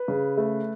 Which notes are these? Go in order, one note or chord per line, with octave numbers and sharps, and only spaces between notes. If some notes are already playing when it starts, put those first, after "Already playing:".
Already playing: B4
C#3
A3